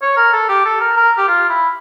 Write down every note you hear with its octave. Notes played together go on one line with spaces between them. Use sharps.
C#5
A#4
A4
G4
A4
A#4
A#4
G4
F4
E4